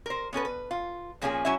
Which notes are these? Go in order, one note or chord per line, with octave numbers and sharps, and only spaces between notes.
A#4 C5
B3 C#4 A4 B4
B4
F4
A#2 F3 A#3 C#4 F4 G#4
F#3 C#4 E4 E5